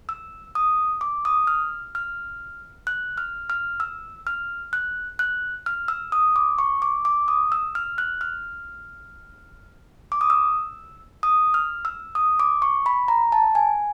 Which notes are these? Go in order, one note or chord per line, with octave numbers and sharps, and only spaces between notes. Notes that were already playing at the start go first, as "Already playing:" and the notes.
E6
D#6
D6
D#6
F6
F6
F#6
F6
F6
E6
F6
F#6
F#6
F6
E6
D#6
D6
C#6
D6
D6
D#6
E6
F6
F#6
F6
D6
D#6
E6
D#6
F6
E6
D#6
D6
C#6
B5
A#5
A5
G#5